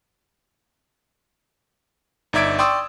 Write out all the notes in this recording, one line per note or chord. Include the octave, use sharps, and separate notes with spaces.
G1 D#4 D5 E5 G#6 D7
D5 G5 C6 C#6 D#6 E6